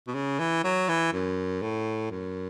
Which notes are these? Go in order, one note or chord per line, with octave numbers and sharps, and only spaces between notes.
B2
C#3
E3
F#3
E3
F#2
A2
F#2